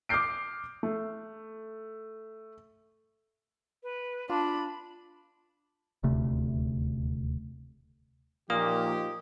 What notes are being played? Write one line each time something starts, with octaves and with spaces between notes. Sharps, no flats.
D6 D#6 F6 G6 C7 D7
A3
B4
D4 F4 B5
D#1 D2 C3 A3
A#2 F3 A#3 D#4 G4 D#6